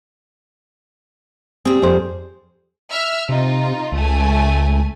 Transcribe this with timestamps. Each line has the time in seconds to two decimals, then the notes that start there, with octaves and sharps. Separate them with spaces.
1.65 G3 C4 G#4
1.82 F2 C5
2.91 E5 E6 F6
3.29 C3 D#4 F4
3.92 C#2 A3 G#5